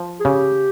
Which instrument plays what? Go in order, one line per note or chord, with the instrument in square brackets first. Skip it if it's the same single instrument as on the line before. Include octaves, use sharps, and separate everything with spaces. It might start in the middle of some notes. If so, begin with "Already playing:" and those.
Already playing: [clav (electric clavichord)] F3
[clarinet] G#4
[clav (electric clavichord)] C#3 [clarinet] G4